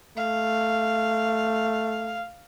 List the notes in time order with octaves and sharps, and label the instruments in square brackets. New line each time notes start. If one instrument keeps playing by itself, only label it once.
[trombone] A3 [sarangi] F5